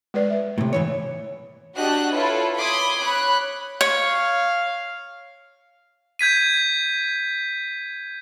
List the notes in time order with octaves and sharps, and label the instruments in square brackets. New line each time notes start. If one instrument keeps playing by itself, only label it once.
[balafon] G#3 B4 D5
E5
[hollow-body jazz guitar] A2 C3
G#2 E3 C#5
[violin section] D4 F#4 G4 D#5 F#6
E4 F4 A4 B4 C#5
B5 C6 D6 D#6 G#6
C#5 B5 F#6
[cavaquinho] C#5 [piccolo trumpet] F5
[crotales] G6 G#6 B6 D#7